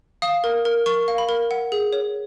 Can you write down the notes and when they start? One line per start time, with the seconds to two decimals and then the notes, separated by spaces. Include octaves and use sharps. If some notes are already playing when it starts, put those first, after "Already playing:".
0.22 F5 D#6
0.44 A#4
0.65 A#4
0.86 A#4 C#6
1.08 F5
1.18 B5
1.29 A#4
1.51 F#5
1.72 G#4
1.93 C#5